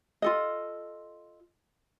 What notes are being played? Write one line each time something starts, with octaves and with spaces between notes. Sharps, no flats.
F4 A4 D#5